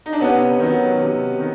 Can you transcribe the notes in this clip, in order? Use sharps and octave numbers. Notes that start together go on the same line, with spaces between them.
D#4
D4
C3 B3 C#4
D#3 F#3
C3
D#3